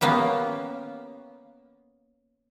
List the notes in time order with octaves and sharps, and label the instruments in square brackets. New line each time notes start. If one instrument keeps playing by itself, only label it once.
[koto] A#3 B3 C#4 G4